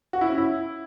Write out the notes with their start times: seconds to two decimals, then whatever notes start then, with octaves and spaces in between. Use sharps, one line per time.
0.13 F#4
0.21 E4
0.29 C#4
0.38 E4